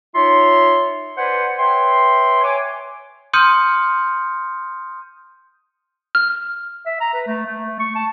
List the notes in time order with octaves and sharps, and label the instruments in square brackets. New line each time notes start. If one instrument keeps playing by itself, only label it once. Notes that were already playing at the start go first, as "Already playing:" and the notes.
[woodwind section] D#4 F4 C#5 E5 C6
B4 C5 D5 F#5 G#5 C6
B4 C#5 E5 G5 C6
C#5 G#5 D6
[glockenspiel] C6 D#6 F6 G6 C#7 D#7
[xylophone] F6
[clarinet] E5
A#5
B4
A3
A3
C#6
A5